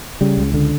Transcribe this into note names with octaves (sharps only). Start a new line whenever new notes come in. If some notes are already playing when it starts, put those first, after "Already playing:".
C#3 G3
C#2
D3